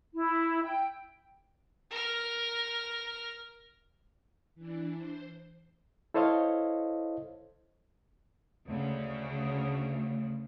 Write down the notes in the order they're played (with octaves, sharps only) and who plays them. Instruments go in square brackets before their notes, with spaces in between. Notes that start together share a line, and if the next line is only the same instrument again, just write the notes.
[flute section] E4
G5
[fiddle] A#4 F6
[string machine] E3 D4
C5
[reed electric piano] E4 A4 C5 C#5 D#5 F5
[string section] D2 C#3